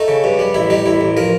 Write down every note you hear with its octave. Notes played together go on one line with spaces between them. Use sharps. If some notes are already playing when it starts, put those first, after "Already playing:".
Already playing: A3 D#4
C#3
G2
G3
A1 E4
G3 D#4
A1 E4
A1
F3 A#4